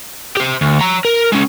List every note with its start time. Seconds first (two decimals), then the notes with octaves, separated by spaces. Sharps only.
0.37 G4 C5
0.61 D2
0.81 C#5 A#5
1.05 A#4
1.33 G#3 C#4